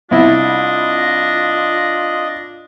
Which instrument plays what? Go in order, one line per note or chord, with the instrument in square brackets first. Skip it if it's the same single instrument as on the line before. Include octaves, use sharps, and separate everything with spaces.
[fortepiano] C2 E4 [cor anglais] D4 [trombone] F4 [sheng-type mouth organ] D#5